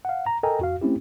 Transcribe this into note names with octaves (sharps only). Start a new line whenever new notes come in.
F5 F#5
A#5
A4 A#4 D#5 G5 G#5 A#5
F2 F#4 F5
A3 C4 C#4 E4 G4